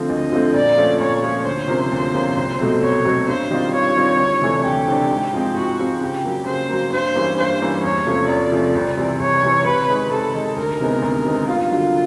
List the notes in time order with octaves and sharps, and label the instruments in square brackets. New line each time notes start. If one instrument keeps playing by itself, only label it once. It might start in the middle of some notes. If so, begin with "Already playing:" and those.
Already playing: [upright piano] D3 F3 A3 C4
[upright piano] D2 [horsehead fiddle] D#5
[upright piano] D3 F3 A3 C4
[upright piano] A#2 [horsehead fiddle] D5
[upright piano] F3 A3 C#4
[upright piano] A#2 [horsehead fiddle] C#5
[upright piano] F3 A3 C#4
[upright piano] D2 [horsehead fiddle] C5
[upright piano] C3 F3 A#3 C#4
D2
C3 F3 A#3 C#4
C2
B2 F#3 A3 C4
[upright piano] C2 [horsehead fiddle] C#5
[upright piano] B2 F#3 A3 C4
[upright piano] G2 [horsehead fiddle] C5
[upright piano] D#3 G3 C4 F4
[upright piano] G2 [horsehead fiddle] C#5
[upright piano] D#3 G3 C4 F4
D2
C3 E3 A3 D4
[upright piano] D2 [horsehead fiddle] G4
[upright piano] C3 E3 A3 D4
G#2
F3 G#3 C4
[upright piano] G#2 [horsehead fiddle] F#4
[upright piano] F3 G#3 C4
[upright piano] C#3 [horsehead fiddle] G4
[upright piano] F#3 A#3
[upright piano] C#3 [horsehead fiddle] C5
[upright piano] F#3 A#3
[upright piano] G2 [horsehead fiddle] C5
[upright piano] E3 G3 A#3 C#4
[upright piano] G2 [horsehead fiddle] C5
[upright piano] E3 G3 A#3 C#4
[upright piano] E2 [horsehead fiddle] C#5
[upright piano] C3 F3 A3 C#4
[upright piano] E2 [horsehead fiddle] D5
[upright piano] C3 F3 A3 C#4
C2
C3 E3
[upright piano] C2 [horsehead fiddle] C#5
[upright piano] C3 E3
[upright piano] C3 [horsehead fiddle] B4
[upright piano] D#3 G#3
[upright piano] C3 [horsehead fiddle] A4
[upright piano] D#3 G#3
[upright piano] D2 [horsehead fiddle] A#4
[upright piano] C3 D#3 G#3 B3
D2
C3 D#3 G#3 B3
[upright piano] G2 [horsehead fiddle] F4
[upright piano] D3 F#3